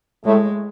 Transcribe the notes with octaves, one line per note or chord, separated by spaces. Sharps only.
A2 G#3 A3